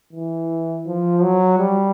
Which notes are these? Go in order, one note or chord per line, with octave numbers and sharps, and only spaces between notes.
E3
F3
F#3
G3